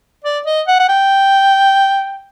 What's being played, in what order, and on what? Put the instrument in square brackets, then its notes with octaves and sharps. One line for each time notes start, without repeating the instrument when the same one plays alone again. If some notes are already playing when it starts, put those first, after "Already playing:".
[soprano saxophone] D5
D#5
F#5
F#5
G5